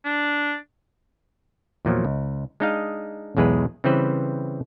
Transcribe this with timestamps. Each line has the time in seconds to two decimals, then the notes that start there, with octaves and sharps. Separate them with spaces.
0.05 D4
1.85 E2 A#2 F3 F#3
2.05 C#2
2.60 G#3 D4 D#4 D#5 F5
3.37 B1 E2 G#3 G#4 B4
3.84 C#3 E3 G3 C4 B4 C5